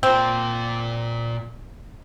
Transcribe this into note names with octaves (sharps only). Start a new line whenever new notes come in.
A#2 C4 F4